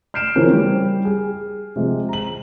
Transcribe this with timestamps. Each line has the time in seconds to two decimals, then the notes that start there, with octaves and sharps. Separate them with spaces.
0.14 F6 G6 C7 D7 E7
0.36 C#3 E3 F3 A#3 C4 C#4
0.53 G3
1.05 G#4
1.76 C3 F3 G#3
2.09 A#5 F#7